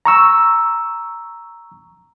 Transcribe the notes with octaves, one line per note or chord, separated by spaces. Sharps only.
A#5 C#6 E6